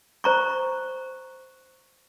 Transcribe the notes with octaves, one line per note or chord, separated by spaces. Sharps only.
C5 A#5 C#6